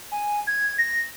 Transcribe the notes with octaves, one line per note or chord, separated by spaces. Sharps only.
G#5
G#6
A#6